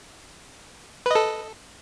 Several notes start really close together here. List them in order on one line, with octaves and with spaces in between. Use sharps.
B4 D#5 A4